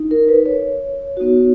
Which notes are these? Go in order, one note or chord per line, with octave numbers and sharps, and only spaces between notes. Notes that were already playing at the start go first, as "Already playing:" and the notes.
Already playing: D#4
A#4
B4
C#5
B3 D#4 F#4